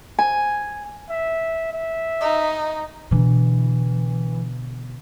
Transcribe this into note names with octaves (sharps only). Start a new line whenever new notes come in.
G#5
E5
E5
D#4
B2 D3 E3